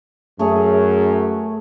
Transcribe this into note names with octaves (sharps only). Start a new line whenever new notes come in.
F#2 A3 G#4 C#5